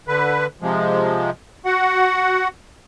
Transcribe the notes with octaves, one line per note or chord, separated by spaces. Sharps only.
D3 B4
C3 F3 G#3
F#4 F#5